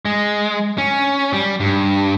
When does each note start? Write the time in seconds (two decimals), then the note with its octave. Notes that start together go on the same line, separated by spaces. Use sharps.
0.05 G#3
0.78 C#4
1.33 G3
1.60 G2